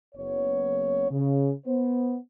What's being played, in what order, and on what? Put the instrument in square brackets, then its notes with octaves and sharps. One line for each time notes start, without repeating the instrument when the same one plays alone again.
[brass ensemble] F#1 B3 C#5
C#3
B3 C5